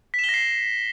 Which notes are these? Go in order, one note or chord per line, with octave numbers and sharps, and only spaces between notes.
B6
E7
G7
A#6
C7